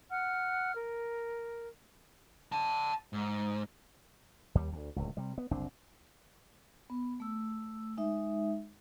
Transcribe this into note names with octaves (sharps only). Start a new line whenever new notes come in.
F#5 F6
A#4
F#5 A5
G#2
D#2 G3
D2
D1 C#2
C3 G3
B3
F#1 C2 C4 D4
B3
A3 E6
G#3 D#4 E5